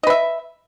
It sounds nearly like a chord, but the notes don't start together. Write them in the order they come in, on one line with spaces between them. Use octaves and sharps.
D#5 B4 E5